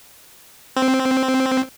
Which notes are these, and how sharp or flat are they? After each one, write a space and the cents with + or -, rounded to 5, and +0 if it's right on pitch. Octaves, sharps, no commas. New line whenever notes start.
C4 +0